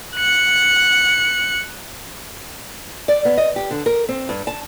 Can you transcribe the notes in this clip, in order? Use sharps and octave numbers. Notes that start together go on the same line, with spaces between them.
F#6 C#7
D5
B3
D#5
G4
D3
A#4
C4
G2
A5